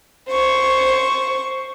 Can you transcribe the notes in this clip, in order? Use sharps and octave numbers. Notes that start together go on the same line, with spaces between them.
C5 C#6